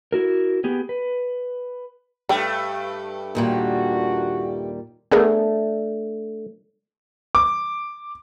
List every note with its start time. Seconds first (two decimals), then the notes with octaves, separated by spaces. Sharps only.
0.12 E4 F#4 A#4
0.64 B3 G4 G#4
0.89 B4
2.29 G2 A3 A4 B4 G5
3.35 D#2 A#2 G3 D4 F#4
5.11 A3 B3 D4 G#4 A#4
7.35 D6